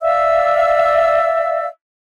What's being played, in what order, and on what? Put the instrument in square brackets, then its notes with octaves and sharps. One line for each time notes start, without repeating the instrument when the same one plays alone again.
[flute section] D5 E5 F5 E6